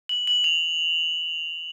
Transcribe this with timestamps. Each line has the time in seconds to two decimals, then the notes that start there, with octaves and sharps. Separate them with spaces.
0.09 F#7
0.27 F#7
0.44 F7